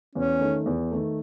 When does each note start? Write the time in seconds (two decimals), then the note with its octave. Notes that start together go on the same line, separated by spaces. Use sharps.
0.15 E2 C#4
0.41 D#3 A3
0.66 E2
0.92 D#3 A3